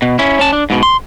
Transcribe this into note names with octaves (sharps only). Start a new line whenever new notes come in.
B2
C#4 E4
C#4 A5
D4
G#2 B2
C6